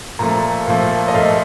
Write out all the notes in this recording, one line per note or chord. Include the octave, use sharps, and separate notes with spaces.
A#2 F3 A3 A#5
A#2 F3 A3
D#5
A#2 F3 A3 F5